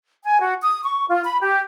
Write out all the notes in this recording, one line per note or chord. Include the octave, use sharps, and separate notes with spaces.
G#5
F#4
D#6
C#6
F4
B5
G4